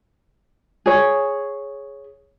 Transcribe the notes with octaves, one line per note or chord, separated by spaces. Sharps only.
G#4 C#5